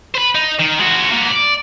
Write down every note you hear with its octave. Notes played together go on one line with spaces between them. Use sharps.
B4 C5
D#4
D#3
G#3 F#4
A#3 B3
D5